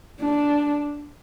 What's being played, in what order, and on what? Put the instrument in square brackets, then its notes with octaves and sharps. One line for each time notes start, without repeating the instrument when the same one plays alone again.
[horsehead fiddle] D4